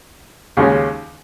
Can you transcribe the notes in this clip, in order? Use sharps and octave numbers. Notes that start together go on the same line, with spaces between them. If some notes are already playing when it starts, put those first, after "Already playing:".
D#2 C#3 G#3 C#4